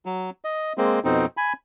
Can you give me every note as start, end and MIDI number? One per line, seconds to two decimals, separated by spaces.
0.06 0.30 54
0.45 0.73 75
0.78 1.00 56
0.78 1.00 58
0.78 1.00 60
1.04 1.26 41
1.04 1.26 47
1.04 1.26 60
1.04 1.26 63
1.37 1.53 80
1.37 1.53 83